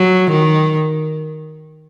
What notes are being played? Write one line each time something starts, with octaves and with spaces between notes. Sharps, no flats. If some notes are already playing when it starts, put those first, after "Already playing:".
Already playing: F#3
D#3